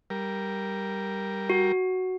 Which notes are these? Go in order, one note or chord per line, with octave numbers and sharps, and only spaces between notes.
G3 A#4
F#4